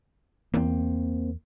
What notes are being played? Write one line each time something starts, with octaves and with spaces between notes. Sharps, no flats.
E2 A#3 C4